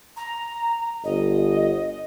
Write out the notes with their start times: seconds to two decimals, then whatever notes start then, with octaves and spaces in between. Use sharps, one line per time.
0.16 A#5
1.04 G1 D#5